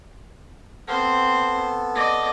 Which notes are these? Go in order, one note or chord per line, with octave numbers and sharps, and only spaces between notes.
B3 C4 A4 C5
D5 D#5